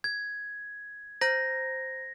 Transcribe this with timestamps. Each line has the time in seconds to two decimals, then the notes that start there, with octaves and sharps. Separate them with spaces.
0.04 G#6
1.21 C5 A#5 G6 A#6